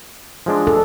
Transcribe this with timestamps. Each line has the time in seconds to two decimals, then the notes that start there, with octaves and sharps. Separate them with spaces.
0.46 F3 G#3 D4
0.67 A4